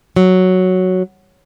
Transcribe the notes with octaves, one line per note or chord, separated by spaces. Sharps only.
F#3